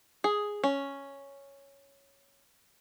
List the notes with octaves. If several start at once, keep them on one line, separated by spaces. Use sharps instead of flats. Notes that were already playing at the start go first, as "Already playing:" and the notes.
G#4
C#4